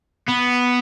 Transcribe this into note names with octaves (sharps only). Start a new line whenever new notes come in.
B3